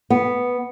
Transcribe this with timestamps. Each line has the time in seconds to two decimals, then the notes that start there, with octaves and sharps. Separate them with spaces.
0.10 B3